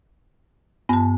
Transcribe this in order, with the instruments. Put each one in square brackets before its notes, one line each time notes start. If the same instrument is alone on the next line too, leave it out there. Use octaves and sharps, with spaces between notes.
[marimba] G2 A5 [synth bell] B3